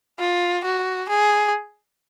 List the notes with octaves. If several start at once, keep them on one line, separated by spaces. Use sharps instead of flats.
F4
F#4
G#4